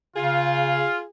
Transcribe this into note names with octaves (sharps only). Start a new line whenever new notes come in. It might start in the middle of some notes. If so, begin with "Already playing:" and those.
C#3 F4 G#4